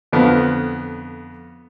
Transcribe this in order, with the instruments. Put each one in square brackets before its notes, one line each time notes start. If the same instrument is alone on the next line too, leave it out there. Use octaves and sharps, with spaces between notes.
[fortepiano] F2 D3 B3